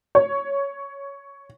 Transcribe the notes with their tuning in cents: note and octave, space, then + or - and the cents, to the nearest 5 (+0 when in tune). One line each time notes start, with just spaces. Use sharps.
C#5 +10